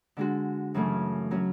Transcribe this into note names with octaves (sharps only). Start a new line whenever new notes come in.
D3 G#3 D4 F#4
F#2 C#3 E3 A3
F#3 C#4 F#4